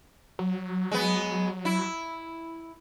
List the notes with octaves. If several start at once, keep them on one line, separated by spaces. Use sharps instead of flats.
F#3
G#3 B3
E4